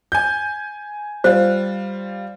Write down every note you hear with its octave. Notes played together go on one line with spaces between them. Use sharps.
G#5 G6
G3 F4 C5